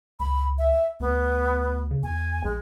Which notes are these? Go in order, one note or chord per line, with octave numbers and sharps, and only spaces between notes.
C#2 B5
E5
D2 B3
C#3
E2 G#5
A#1 G#3